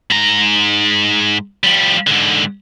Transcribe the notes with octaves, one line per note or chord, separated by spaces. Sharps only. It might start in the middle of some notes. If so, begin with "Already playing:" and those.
G#2 A#5
F3 G3
G#2 D3